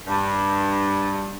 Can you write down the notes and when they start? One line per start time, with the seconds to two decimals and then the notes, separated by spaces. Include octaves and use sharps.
0.07 G2